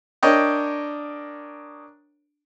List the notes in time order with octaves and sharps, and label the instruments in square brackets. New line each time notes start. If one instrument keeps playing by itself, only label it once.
[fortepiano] D4 A#4 C#5 D#5 G5